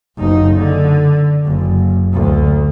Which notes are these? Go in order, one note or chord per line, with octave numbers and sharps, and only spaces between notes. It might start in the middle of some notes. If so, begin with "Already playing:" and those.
F#1 D#4
D3
F#1
D2